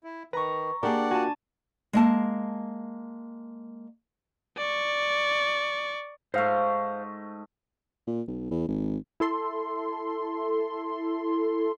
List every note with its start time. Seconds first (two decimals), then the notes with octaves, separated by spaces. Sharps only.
0.04 E4
0.33 D#3 B4 A#5 C#6
0.83 A#3 D4 G4 G#4 A#4 D5 F#5
1.11 F4 F#4 G#5 A5
1.93 G#3 A#3 A5
4.57 D5 C#6
6.34 G#2 A3 C5 F5
8.07 A#2
8.28 B1
8.51 E2
8.68 G#1
9.20 E4 A4 C6